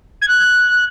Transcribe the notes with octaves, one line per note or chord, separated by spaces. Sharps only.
G#6
F#6